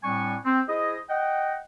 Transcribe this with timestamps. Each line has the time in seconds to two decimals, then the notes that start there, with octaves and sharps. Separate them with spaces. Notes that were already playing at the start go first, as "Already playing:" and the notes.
0.04 A2 G3 C4 D4 G#5 C#6
0.45 C4
0.69 E4 G#4 C5 D#5
1.09 D#5 F#5 G5